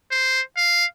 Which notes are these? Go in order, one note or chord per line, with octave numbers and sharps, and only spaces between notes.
C5
F5